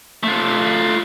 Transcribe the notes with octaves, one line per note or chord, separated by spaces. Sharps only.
A3 F4